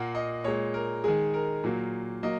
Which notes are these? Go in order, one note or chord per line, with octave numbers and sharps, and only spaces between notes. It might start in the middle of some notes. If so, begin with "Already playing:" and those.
Already playing: A#2 A#3 F#5
D#5
A#2 G#3 C#5
A#4
D#3 G#3 G#4
A#4
A#2 F#3 A#3
F#3 A#3 D#5